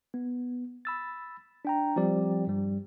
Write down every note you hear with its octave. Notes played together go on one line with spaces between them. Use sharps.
B3
B5 E6 A6
D4 G5 A#5
F3 G3 C4 G4 D5
G2 G3